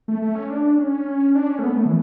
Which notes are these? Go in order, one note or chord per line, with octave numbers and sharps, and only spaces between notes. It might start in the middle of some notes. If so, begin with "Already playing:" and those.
A3
A3
C#4
D4
C#4
D4
C#4
A3
B3
A3
E3